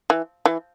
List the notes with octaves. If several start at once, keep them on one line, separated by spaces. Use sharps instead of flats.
E3
E3